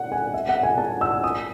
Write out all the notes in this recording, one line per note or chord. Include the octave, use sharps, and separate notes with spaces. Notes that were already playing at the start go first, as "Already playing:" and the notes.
Already playing: F#5
G#5
E5
F#5
G#5
A5
E6
D#6